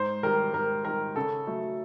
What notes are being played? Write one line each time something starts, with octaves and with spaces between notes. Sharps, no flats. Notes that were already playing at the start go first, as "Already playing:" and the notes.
Already playing: G#2 C5
D#3 G3 A#4
G#2 A#4
D#3 G3 A#4
C#3 A4
F#3 A3